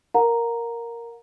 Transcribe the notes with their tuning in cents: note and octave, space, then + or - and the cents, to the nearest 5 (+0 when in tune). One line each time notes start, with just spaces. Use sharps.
A#4 +0 F#5 -40 A#5 +0